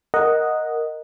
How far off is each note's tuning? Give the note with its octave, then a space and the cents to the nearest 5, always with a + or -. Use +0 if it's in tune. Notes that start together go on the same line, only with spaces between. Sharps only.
A#4 +0 D#5 +0 F#5 -5